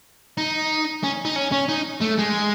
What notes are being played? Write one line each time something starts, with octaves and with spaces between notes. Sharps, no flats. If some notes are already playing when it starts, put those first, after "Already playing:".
D#4
C#4
D#4
C#4
C#4
D#4
A3
G#3